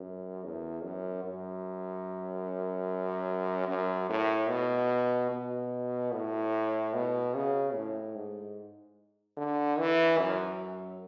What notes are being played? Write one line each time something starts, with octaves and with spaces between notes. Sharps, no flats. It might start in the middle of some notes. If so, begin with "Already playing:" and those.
Already playing: F#2
E2
F#2
F#2
F#2
A2
B2
B2
A2
B2
C#3
A2
G#2
D3
E3
F#2